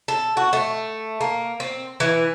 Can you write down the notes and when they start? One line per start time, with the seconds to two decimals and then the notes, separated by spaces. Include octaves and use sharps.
0.08 A4
0.37 F#4
0.53 A3
1.20 A#3
1.60 C4
2.00 E3